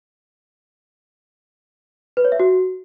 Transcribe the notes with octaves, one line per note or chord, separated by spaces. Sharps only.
B4
C#5
E5
F#4